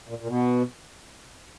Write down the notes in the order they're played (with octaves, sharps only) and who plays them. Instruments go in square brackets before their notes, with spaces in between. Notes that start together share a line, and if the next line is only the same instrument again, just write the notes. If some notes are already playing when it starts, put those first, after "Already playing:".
[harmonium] A#2
A#2
B2